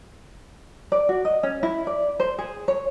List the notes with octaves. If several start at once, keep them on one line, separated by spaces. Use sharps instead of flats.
D5
F#4
D#5
C#4
E4
D5
C5
G#4
C#5